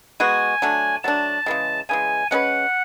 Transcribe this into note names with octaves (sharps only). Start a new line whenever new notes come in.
G#3 B3 F#4 G#5
F#3 A3 D4
F#3 A3 D4 A5
C#3 E3 G#3
C#3 E3 G#3 G#5
G#3 C#4 G#4 B4 F#5